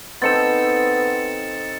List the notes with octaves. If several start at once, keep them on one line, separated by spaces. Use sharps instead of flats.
B3 C4 D#4 A4 A6 C#7 E7